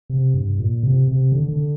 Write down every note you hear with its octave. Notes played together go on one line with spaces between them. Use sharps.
C3
G2
A#2
C3
C3
D3
D3